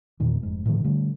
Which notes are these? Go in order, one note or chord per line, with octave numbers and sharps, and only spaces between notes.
E2 A#2 D#3
F1 G#2
A2 D3 D#3 F3
D3 G3 A3